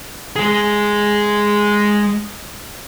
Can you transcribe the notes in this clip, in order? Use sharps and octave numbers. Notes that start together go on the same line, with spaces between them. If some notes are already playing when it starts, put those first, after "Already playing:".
G#3 G#4